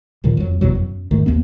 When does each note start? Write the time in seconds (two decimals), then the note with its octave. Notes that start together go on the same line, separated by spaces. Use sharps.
0.24 D1 A#2 D#3 F3
0.37 F2 F#3
0.61 G1 E2 B2 F#3
0.75 F#2
1.11 G#2 D#3 A3
1.26 D#2 A#3 C4